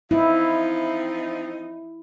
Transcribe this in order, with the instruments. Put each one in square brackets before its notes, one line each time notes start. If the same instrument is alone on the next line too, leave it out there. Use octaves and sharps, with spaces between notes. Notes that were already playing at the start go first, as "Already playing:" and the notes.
[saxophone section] F3 C4 D#4 [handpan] E4